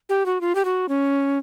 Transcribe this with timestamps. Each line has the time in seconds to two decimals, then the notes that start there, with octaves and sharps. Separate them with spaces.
0.09 G4
0.26 F#4
0.41 F4
0.55 G4
0.65 F#4
0.89 C#4